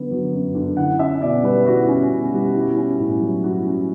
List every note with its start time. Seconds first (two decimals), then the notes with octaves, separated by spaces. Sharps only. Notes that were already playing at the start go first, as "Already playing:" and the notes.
Already playing: D3 F#3 B3
0.11 F#3
0.33 F#2
0.55 D3
0.77 E4 F#5
0.99 C#4 E5
1.21 B2 D5
1.43 G3 B4
1.66 E4 F#4
1.88 C#4
2.10 B2
2.33 G3
2.54 E4
2.76 C#4
2.99 A2
3.21 F#3
3.44 E4 F#4
3.66 C#4